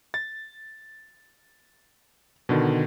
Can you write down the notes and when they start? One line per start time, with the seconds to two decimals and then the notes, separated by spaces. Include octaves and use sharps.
0.14 A6
2.49 B2 D3 D#3